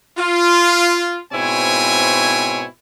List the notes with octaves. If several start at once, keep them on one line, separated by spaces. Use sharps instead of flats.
F4
G#2 B2 C4 E4 C#5 G#5